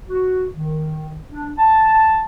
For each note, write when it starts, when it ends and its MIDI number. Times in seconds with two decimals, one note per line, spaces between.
0.10 0.46 66
0.53 1.16 51
1.32 1.52 62
1.58 2.25 81